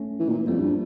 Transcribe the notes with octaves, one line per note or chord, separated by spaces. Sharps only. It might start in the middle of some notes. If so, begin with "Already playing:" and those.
Already playing: A3 C#4
E3
A#2
F2 G3 A#3
G2